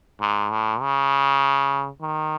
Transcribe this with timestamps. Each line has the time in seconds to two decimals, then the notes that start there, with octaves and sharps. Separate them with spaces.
0.21 G#2
0.51 A2
0.81 C#3
2.01 D#3